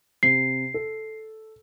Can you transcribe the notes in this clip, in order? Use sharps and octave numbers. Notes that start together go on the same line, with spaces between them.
C3 C7
A4